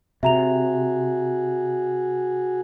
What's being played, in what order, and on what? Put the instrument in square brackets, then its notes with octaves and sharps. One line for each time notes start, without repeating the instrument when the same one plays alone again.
[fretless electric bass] C3 [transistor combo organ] F#4 G#4 [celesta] E5 A#5 F7